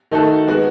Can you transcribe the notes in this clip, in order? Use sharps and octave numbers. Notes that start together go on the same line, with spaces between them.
D#3 A3 D#4 F#4 A4
G#3 B3 D#4 F#4